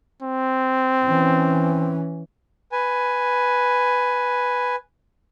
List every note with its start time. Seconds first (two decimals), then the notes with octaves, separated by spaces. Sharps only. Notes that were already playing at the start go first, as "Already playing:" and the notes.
0.22 C4
1.05 E3 C#4
2.72 B4 G#5